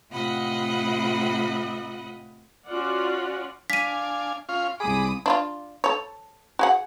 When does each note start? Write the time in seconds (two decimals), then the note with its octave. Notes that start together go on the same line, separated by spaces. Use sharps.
0.12 A2 C3 F4 D#5 F#5 B5
2.68 C#4 F4 F#4 D5 F#5
3.70 D4 F5 G#5 B6 D#7
4.49 C#4 F4 F5
4.80 C2 G#4 B5 D6 D#6
5.26 D4 E4 F4
5.84 A4 C#5
6.59 F#4 G#4 F#5